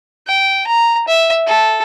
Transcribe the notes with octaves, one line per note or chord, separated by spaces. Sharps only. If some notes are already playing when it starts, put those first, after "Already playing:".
G5
A#5
E5
A4